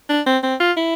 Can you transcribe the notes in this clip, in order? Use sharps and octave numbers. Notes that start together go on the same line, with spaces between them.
D4
C4
C4
F4
E4